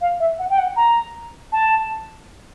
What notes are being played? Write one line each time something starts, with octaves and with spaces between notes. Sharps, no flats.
F5
E5
F#5
G5
F#5
A#5
A5